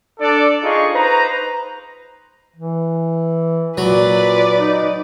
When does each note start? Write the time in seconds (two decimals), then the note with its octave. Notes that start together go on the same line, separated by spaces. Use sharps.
0.20 D4 A4 D5
0.63 D4 D#4 F4 G#4 D#5 C#6
0.94 D#4 B4 C5 A#5
2.56 E3
3.78 A#2 F#3 B4 D5
4.57 D#4